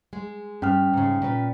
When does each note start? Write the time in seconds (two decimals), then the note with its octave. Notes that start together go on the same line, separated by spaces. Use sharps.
0.13 G#3
0.62 G2 C#4 G5 F6
0.93 G#2 C#3
1.22 A#2 B4